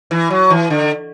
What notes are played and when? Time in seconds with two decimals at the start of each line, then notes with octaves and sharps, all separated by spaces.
0.11 E3
0.30 F#3
0.50 E3
0.70 D3